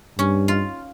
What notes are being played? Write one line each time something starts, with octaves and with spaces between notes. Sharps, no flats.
G2 C#4
F4